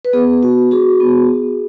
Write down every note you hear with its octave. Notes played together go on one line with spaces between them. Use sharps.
B4
B3 G#4
F#4
F#4 G#4
B3